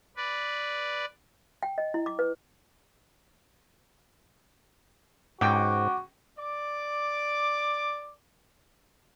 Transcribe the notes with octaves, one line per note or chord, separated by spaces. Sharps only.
B4 D5
G5
D#5
E4
D6
B4
C#2 G#2 F#4 F#5 G5 D6
D5 D6